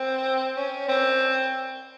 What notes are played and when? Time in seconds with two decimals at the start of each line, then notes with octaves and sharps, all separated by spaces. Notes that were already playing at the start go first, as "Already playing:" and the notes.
Already playing: C4
0.57 C#4
0.89 C4